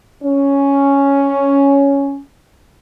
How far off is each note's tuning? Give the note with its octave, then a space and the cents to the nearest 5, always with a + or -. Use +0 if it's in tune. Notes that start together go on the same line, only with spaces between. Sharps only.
C#4 +5